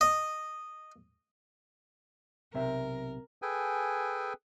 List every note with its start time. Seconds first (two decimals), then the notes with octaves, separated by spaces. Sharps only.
0.01 D#5
2.54 B1 C3 A#4 E5
3.42 G#4 A4 B4 G5 G#5